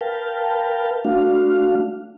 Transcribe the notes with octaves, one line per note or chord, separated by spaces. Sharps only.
A#4 B4 F5 G5 A5
A3 D4 F#4 F5